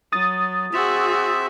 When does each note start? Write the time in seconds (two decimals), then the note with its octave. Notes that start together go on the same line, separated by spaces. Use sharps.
0.12 F#3 D#6 A6
0.73 C4 F#4 G#4 E5